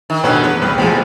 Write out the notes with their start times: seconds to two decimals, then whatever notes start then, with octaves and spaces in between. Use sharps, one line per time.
0.10 D#3
0.23 B2 D3 C#4 B4
0.43 E2 B4
0.62 C2 G3 B4
0.78 B1 E2 F3 G#3